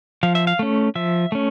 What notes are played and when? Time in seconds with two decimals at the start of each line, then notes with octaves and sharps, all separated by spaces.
0.23 F3 F5
0.35 E5
0.47 F5
0.59 A3 C#4
0.95 F3 E5
1.32 A3 C#4